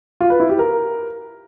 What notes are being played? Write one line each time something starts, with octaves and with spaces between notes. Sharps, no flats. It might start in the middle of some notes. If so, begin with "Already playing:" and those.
F4
B4
E4
G4
A#4